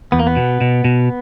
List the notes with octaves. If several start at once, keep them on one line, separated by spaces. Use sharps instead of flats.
E2 B3
A#3
B3
B2
B2
B2